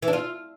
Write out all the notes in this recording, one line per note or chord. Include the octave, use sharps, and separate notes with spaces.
E3
D4
F4